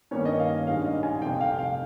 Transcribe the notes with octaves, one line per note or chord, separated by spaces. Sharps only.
G2 D#3 A#3 C#4 C#5
D#5
F5
A#1 G#2 G3 C#4 F5
D#5
G#5
F1 F2 C3 G5
F5
F5